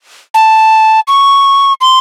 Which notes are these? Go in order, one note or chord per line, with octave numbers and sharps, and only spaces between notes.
A5
C#6
C6